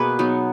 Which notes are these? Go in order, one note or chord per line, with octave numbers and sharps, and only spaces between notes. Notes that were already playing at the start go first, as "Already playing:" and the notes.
Already playing: B2 A#3 G#4 B4
F#3 B3 D#4